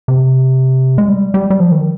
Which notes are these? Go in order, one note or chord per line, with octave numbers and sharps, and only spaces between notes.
C3
G#3
G3
G3
G3
F3
D#3